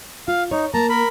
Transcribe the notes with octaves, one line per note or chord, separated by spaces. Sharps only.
F4 F5
D#4 C#5
A#3 A5 A#5
A#4 B5